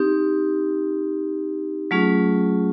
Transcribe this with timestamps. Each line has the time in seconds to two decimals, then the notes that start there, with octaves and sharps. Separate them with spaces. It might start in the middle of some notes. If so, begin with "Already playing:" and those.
Already playing: C4 D#4 G4
1.91 F#3 A3 C#4 F4 G#4